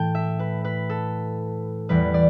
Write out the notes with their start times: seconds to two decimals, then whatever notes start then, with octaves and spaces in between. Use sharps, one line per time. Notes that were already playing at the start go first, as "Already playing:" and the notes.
Already playing: A2 E3 A3 G5 A5
0.15 E5
0.39 B4
0.64 B4
0.90 A4
1.89 E2 E3 G3 B4
2.14 D5